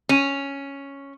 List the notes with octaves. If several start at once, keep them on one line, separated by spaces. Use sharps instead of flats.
C#4